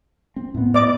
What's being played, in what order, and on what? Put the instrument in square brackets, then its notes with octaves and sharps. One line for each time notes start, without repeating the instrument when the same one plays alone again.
[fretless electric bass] C4
A2 B3
[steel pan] D5 D#5 D6